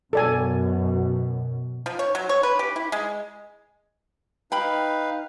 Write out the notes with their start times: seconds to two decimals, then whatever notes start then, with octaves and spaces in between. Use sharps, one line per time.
0.13 F#2 B2 A4 D5 G#5
1.86 F3
1.99 C#5
2.15 F#3
2.29 C#5
2.43 B4
2.59 G4
2.76 E4
2.92 G#3
4.52 D#4 B4 F5 G5 B5